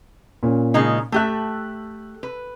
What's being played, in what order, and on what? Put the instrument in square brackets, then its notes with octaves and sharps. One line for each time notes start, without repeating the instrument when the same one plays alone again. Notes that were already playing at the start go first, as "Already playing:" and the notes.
[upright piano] A#2 C#4
[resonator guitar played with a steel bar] C#3 G#3 D#4
[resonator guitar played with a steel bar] A3 G4 E5 [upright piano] E6 F#6
[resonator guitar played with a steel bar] B4